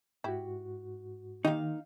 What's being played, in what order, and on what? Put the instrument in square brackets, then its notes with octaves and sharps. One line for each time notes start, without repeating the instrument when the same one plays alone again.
[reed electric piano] G#2 F#4 [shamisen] E4 G4
[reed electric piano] D#3 [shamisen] A#3 G4 D#5 [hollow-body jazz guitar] D#4 F5